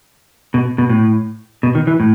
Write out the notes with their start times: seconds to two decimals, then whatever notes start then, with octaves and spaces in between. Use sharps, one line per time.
0.54 B2
0.78 B2
0.89 A2
1.63 B2
1.75 D#3
1.87 E3
2.00 A2